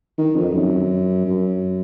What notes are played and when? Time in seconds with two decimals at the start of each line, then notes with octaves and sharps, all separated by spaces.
0.18 D#3
0.35 F2
0.54 F#2
1.25 F#2